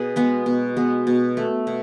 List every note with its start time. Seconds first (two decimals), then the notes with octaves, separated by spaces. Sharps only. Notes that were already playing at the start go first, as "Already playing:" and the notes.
Already playing: B2 G#4 B4
0.16 G#3 B3
0.46 B2
0.77 G#3 B3
1.07 B2
1.37 A3
1.67 B2